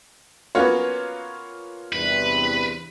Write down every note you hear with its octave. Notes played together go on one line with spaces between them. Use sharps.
A#3 B3 C#4 F4 F#4 C#5
E2 G2 C3 B4